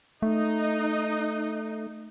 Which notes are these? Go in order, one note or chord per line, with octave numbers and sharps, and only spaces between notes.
A3 D#4 D#5